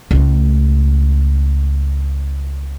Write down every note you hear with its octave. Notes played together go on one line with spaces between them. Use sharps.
C#2 A3